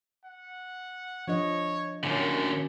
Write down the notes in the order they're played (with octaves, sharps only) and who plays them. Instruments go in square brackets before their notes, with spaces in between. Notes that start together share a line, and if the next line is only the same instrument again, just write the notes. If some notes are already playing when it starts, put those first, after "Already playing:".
[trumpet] F#5
[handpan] F3 D4 D#5 [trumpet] C#5
[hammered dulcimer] F#2 A#3 C#4 [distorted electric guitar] A2 D3 [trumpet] G4